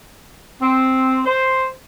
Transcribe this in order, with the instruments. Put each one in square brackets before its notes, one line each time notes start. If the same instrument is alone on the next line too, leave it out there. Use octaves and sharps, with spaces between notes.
[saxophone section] C4
C5